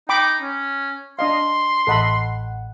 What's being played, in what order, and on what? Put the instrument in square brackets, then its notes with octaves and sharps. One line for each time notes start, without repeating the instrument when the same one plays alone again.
[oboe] D#4 [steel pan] G5 B5 D6
[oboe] C#4
[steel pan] D4 D#5 F5 [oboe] C6
[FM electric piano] A1 F#5 [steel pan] A4 D#5 B5